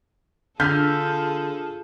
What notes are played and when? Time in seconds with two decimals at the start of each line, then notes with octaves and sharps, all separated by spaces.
0.60 D3 F4 G#4 A4 F6 G6 B6